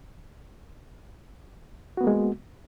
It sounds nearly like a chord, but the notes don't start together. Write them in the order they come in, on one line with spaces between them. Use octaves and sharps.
F#4 B3 A#3 G#3